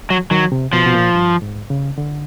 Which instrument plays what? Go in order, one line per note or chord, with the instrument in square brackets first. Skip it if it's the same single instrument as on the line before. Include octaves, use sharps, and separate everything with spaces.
[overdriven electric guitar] F#3
[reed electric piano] D#3 [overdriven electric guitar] F#3
[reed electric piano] C3
[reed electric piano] B2 [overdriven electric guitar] F3
[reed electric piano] B2
A#2
G2
G#2
C#3
D3